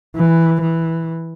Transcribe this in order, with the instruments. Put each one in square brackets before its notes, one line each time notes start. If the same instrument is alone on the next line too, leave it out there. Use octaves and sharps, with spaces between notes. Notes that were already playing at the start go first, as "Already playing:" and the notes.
[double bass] E3
E3